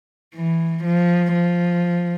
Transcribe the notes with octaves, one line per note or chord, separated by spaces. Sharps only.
E3
F3
F3